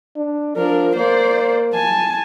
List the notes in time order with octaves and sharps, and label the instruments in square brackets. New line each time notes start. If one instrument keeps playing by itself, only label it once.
[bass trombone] D4
[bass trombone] F3 [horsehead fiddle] D4 A#4
[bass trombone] A#3 [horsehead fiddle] C5 D5
[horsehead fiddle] G#5 A5